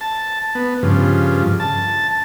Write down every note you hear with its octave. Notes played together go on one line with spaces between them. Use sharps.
A5
B3
G2 C#3 F3
A5